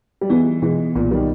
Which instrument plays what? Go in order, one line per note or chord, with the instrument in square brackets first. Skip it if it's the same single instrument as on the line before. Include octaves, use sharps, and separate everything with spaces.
[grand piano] G3
[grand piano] E3 G#3 [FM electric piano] B3
[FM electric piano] B2 [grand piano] E3 G#3
[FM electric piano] B1 [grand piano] A#2
[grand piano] D#3 G3